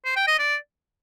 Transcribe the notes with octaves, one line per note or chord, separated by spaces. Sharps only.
C5
G5
D#5
D5